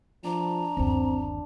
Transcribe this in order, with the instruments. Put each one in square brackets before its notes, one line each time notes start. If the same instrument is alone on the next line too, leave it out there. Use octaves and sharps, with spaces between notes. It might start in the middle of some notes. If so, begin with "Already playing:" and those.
[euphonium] F3 [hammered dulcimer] D4 [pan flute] A#5
[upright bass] G1 D#2 [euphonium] C4